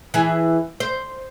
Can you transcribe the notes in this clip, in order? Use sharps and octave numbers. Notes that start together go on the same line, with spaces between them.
E3 G#4
C5